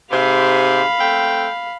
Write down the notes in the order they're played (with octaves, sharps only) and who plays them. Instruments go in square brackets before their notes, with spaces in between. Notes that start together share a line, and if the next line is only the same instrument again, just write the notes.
[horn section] G#2 C3 [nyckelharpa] F5 B5
[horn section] A3 C4 G5